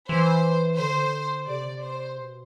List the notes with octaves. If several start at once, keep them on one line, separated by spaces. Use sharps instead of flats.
E3 C5
D3 C5
C3 D5
C5
B2